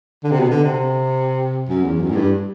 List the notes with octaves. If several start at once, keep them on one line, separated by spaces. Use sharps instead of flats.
D3
C3
B2
D3
C3
F#2
E2
F#2
A2
G2